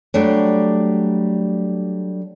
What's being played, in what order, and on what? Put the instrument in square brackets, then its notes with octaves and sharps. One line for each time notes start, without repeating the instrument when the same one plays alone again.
[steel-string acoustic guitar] F#3 G3 A3 D4